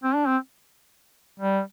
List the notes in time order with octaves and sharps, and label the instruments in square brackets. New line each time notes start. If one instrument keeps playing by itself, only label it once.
[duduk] C4
D4
C4
G3